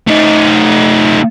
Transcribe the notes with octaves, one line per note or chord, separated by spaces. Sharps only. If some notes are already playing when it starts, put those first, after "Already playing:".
A3 D#4